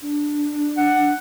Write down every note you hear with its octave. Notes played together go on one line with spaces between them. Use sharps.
D4
F#5